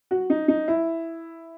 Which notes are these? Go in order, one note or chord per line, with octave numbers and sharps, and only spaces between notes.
F#4
D#4
D#4
E4